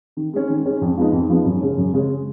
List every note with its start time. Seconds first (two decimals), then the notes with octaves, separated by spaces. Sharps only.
0.17 D#3
0.33 G#3 C#4
0.49 D#3
0.65 G#3 C#4
0.81 F2
0.97 F3 G#3 B3 D#4
1.13 F2
1.29 F3 G#3 B3 D#4
1.45 F#2
1.61 C#3 G#3 C#4
1.78 F#2
1.93 C#3 G#3 C#4